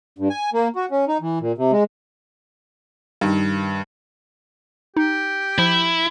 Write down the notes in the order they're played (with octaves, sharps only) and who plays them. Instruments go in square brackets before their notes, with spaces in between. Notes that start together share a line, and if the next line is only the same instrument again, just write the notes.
[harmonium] G2
G#5
A#3
F#4
C#4
D#4
E3
A#2
C3
G#3
[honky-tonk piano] G2 D#3
[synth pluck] D#4 [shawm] G4
[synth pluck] F3 [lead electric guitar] E4